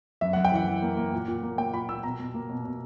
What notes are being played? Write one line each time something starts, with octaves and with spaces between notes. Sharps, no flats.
F#2 E5
F#5
F#2
G5
E3 F#5
E3
A#3
A#3
A#2
A#2
A#3
A#3 G5
A#2 B5
A#2 E6
B2 A#5
B2
A#3
B2
B2